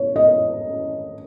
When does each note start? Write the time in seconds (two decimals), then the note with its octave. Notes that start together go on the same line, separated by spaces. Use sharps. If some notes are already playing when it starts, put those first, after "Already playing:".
Already playing: C#5
0.16 D#5